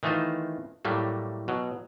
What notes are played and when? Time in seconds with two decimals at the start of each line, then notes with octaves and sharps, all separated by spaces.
0.03 D#3 E3 A3 D#4 F4 C5
0.85 A2 F#3 G3 A3 A#3
1.48 B2 F#3